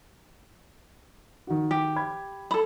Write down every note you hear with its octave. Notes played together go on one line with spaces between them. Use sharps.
D#3 F#4
G4
B5 G#6
A4 B5